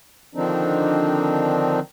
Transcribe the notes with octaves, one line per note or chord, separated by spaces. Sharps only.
D3 D#3 F3 C4 D4 D#4